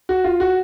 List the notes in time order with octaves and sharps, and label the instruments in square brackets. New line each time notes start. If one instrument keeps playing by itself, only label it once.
[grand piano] F#4
F4
F#4